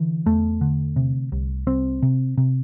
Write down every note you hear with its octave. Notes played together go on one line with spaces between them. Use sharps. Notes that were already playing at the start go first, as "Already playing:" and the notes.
Already playing: D3 E3
E2 A3
D3
C3
C2
C2 C4
C3
C3